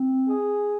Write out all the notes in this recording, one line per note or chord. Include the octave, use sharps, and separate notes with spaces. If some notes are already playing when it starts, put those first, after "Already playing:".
Already playing: C4
G#4